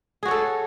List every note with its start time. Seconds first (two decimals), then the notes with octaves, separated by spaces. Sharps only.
0.23 G#4
0.25 F#4
0.28 C#5
0.31 A4